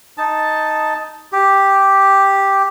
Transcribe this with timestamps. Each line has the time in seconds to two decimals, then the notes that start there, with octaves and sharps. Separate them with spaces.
0.18 D#4 A5
1.32 G4